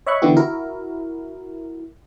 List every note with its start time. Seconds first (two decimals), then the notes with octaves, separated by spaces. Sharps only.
0.06 C#5 D#5 E5 B5 C#6 F#6
0.22 D3 E3 B3 E4 G4
0.36 E4 F#4 A#4